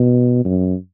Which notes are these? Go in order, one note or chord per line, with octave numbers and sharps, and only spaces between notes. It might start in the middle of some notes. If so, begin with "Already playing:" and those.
Already playing: B2
F#2